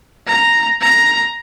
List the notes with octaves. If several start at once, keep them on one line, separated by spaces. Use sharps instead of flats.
A#5
A#5